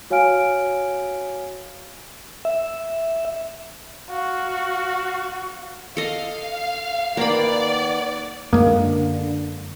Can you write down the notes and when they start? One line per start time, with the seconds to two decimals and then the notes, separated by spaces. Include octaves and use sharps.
0.10 F#4 C#5 F5 G#5 F6 D7
2.45 E5
4.11 F#4 F5
5.97 A4 D#5 F5
7.17 D#3 A#3 B3 D5 B5
8.53 F#2 D3 G#3 A#3